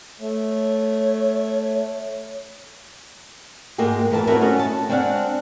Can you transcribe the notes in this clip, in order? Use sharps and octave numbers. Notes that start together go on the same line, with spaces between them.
A3 C#5
G#2 G#3 A#3 F#4 G#4 G5
D2 E3 A#4 D#5 A5
B3 C4 E4 F#4 A#4 C#5
A3 C#4 F#4 D#5
A5
G#3 C4 D4 C#5 F5 F#5